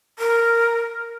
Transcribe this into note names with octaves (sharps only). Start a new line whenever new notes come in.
A#4